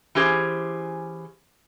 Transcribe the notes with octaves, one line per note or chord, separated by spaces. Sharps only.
E3 C#4 G4 G#4 C5